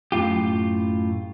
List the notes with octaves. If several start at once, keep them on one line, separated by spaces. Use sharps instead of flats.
F#2 A2 F4 G4